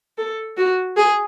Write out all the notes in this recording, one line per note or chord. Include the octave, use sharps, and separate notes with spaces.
A4
F#4
G#4